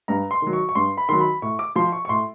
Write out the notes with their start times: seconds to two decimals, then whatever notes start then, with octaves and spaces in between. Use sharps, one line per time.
0.08 G2 A#5
0.31 C6
0.42 D#3 F#3
0.53 C#6
0.69 C#6
0.75 G2 C6
0.97 B5
1.09 D#3 F#3 C6
1.20 B5
1.42 A2 C#6
1.59 D6
1.76 F3 C6
1.92 C#6
2.05 C#6
2.09 A2 C6